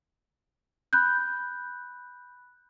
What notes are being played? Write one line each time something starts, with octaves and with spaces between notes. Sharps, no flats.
B5 F#6 G6